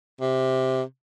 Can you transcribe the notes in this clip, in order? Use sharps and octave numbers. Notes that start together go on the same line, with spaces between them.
C3